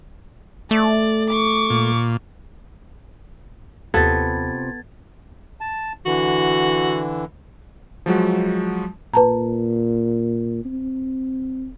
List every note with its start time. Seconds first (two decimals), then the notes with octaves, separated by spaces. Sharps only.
0.71 A3 D5
1.30 C#6 D6
1.70 A#2
3.94 D#2 C3 B3 F4 A4 B4 G#6 A6
5.61 A5
6.06 D3 E3 F#4
8.06 F3 F#3 G#3 F#4
9.14 A#2 B4 A5 A#5
10.65 C4